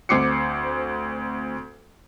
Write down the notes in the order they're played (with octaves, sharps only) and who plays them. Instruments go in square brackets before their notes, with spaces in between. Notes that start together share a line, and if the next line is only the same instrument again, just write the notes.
[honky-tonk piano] D2 C4 D6 C7 C#7